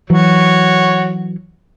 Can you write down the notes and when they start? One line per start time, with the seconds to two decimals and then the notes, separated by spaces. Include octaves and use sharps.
0.10 E3 F#3 F#4 C#5